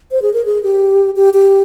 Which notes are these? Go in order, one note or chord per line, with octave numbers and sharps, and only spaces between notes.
C5
G#4
A#4
G#4
G4
G4
G4